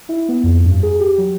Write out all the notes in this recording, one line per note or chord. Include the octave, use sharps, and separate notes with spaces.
E4
B3
F2
G2
G#4
G4
F#3